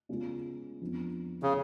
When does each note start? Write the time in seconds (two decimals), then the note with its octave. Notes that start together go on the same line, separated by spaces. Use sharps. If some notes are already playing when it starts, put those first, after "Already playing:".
0.09 C#3 G#3 B3 F4
0.81 F2 F3 B3 D4
1.43 C#3